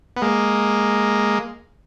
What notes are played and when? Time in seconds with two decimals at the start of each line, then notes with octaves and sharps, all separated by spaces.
0.17 B3
0.22 G#3 A#3